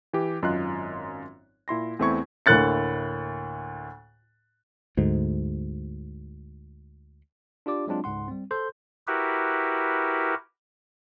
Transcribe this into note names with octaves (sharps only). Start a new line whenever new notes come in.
E3 G4
G#1 F#2 F4 D#5 C6 F#6
A#2 E4 C6 A#6
E2 A3 C4 E4 C#6 G#6
D2 A2 A#3 F#6 A6 C#7
D2 G#2
D4 F4 G4 D5 D6
F#3 G#3 C4 D4 F4
C#2 G#2 F#5 C6
G3 C4
A4 C5 C6 G6
E4 F#4 G4 A#4 B4